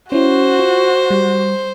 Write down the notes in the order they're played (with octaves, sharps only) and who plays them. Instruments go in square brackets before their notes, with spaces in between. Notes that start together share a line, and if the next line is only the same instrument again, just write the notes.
[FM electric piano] C#4 E4 [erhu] F#4 [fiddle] C5
[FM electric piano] F4
G3